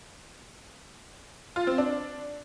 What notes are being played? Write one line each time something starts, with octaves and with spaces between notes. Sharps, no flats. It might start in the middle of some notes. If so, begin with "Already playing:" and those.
F4
C4
D4